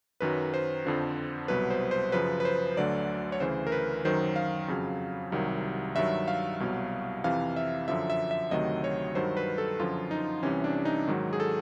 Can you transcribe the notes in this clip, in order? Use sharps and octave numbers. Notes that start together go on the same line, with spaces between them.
F#2 D#3 F#3 B4
C5
F2 D3 F3
C2 B2 F#3 B4
C5
C5
F#2 C#3 F3 B4
B4
C5
D2 D3 F#3 D5
C#5
D2 C#3 E3 C5
A#4
B4
F#2 D#3 F#3 C5
F5
F2 C#3 F#3
C2 C3 D#3 F#3
G2 D#3 F#3 E5
F5
C2 B2 F#3
F2 C3 E3 F5
E5
F#2 D3 F3 E5
E5
E5
D2 C3 D#3 F#3 D#5
C#5
G2 D#3 F#3 C5
B4
A4
F#2 D3 F3 F4
D#4
C2 C3 E3 C#4
D4
D#4
G#2 D#3 F#3
G#4
A4